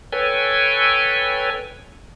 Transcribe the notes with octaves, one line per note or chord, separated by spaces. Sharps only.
A4 B4 C#5 G5 G#5